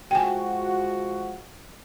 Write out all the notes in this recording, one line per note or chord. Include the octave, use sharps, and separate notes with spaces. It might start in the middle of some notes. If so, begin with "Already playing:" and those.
F3 G#3 F#4 G5 G#5